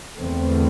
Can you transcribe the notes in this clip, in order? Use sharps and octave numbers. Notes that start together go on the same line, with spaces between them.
E2 D3 A3 C4